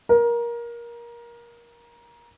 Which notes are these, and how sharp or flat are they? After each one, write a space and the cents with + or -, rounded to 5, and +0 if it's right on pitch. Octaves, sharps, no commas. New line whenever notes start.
A#4 +20